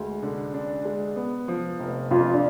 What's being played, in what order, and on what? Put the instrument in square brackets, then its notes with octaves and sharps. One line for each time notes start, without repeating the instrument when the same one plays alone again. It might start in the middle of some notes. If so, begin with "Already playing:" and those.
Already playing: [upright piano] D2 G#3
D3
D4
G#3
B3
F3
F1
[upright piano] F2 [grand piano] F4
[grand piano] D4